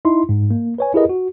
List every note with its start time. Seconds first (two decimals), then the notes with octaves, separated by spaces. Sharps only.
0.05 D#4 E4 C6
0.29 G#2
0.51 A#3
0.78 B4 C#5 G#5
0.94 E4 G4 G#4 A#4 B4 D#5
1.09 F#4